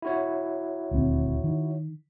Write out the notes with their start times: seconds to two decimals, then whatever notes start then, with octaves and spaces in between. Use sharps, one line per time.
0.02 E4 F#4 C#5
0.91 D#1 D2 C4
1.44 D#3